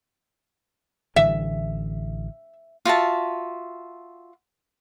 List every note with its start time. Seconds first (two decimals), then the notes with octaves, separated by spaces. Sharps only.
1.16 A1 D3 E3 E5
2.85 F4 F#4 E5 A5